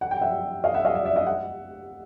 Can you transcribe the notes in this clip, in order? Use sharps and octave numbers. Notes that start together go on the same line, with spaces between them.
F#5
G5
E5 F#5
D#5 F5
E5 F#5
D#5 F5
D5 E5
D5 E5
D#5 F5
E5 F#5